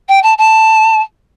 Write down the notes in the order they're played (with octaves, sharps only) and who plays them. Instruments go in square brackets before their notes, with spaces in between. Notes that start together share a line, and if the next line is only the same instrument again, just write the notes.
[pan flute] G5
A5
A5